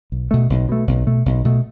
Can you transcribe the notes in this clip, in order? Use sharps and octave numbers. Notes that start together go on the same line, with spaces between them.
B1
B2 A3
B1
B2 A3
B1
B2 A3
B1
B2 A3